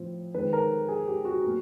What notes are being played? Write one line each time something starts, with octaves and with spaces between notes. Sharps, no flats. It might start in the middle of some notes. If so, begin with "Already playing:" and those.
Already playing: A2 F3 C4
D#3 G#3 C4 B4
A#4
G#4
G4
F#4
A2 F#3 A#3